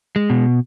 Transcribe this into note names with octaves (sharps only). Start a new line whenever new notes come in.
G#3
B2